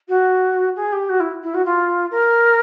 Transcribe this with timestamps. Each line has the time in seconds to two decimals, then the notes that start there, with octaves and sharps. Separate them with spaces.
0.08 F#4
0.75 G#4
0.92 G4
1.09 F#4
1.20 E4
1.43 E4
1.54 F#4
1.65 F4
2.11 A#4